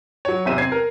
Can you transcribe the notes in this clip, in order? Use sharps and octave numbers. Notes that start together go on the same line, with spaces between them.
F#3 C#5
E1 E2 C3 C5 E5 D#7
C4 G#6 C7
A#4